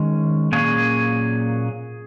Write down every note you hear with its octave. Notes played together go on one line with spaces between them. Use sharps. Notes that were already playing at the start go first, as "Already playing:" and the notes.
Already playing: D#3 G#3 C#4
A#2 F#3 A#3 C#4 G#4